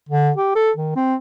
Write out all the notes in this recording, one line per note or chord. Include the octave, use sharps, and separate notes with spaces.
D3
G4
A4
D#3
C4